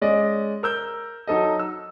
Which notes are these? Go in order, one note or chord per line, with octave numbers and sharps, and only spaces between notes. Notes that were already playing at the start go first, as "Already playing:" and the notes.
G#3 C#4 D5 D#5
A#4 E6 G6
F#3 D#4 A4 D#5
E6